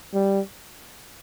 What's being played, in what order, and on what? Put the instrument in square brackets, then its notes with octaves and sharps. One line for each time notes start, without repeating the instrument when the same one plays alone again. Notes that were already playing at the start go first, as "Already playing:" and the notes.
[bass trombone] G3